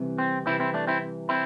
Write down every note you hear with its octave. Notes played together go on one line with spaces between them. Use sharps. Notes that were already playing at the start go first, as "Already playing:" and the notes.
Already playing: C2 C3 E3
C4
C2 C3 E3 C4 E4
C4 E4
A3 D4
C4 E4
C4 E4